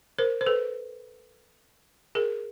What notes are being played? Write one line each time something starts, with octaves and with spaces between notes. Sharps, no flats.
A#4 C5
C5
A4 B4
G#4 A#4